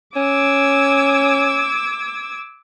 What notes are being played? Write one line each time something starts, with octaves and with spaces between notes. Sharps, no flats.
C#4 D6 E6 G#6